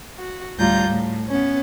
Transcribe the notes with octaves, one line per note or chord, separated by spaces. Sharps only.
F#4
D2 A2 G3 F4 A#5 G6
A2
B3 C#4